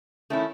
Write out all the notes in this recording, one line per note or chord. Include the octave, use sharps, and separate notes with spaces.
D#3 A3 C#4 E4